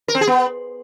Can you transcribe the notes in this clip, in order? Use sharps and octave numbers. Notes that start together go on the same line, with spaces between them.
A#4
C4
G#4
B3